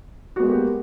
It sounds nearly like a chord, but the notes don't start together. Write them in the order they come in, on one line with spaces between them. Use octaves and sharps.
F#4 B3 G#3 A#3 G4